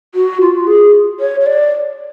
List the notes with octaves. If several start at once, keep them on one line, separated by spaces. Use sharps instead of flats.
F#4
F4
G#4
C#5
C#5
D5